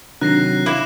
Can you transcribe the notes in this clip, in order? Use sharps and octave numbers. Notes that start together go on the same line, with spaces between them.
C3 D#3 F#3 D4 F#6 A#6 C7
E4 F5 D6 E7